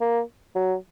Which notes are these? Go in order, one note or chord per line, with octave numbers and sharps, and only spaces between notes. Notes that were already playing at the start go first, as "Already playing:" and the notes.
A#3
F#3